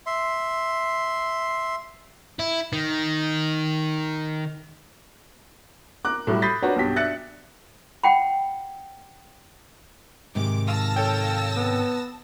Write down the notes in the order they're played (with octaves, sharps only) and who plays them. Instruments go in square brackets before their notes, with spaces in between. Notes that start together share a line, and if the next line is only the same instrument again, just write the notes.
[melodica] E5 C6
[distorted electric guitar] E4
D#3
[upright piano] A#4 D6 F#6
A2 F#3 G3
B5 D#6 G6 A6 B6 C7
D4 F#4 A#4 B4 C#5 F#5
B1 G2 F#4 G4 B6
D4 E5 F#6 A6 C#7
[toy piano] F#5 G5 B5
[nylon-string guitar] G#2 C3 D#3 [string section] D6
[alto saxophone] F5 [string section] A5 E6 A#6
[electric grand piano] A4 C#5 G5
[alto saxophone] B3